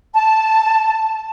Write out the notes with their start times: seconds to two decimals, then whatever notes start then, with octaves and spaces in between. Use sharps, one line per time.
0.14 A5